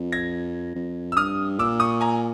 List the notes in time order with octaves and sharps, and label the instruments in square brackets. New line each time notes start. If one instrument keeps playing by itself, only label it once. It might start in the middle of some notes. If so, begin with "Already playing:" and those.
Already playing: [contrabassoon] F2
[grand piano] G#6 A#6
[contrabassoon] F2
[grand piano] E6
[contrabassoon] G2 [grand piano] D#6 F6
[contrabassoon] A#2 [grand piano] D6 E6
[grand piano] C#6 D#6
G#5 A#5